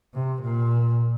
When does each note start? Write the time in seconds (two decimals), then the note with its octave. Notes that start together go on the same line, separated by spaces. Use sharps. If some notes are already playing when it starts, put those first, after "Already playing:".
0.14 C3
0.42 A#2